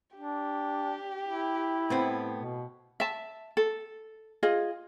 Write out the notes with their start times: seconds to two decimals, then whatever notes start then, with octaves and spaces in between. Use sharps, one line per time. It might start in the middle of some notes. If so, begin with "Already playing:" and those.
0.16 D4 G4
1.25 E4
1.90 A2 B3 C4
2.37 B2
3.00 E5 A5
3.57 A4
4.43 F4 G#4 D#5